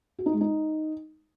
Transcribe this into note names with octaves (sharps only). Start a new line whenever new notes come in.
F#4
D#4
G#3
D#4